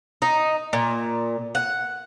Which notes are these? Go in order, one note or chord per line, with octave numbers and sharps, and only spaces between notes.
D#4
A#2
F#5